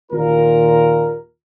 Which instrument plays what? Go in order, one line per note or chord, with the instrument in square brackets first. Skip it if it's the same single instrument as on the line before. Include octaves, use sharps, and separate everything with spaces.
[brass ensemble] D#2 A#2 F4 A#4